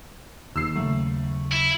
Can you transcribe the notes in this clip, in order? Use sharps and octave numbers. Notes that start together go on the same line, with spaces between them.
D#2 E6 C7
C#3 F#3 A3
E4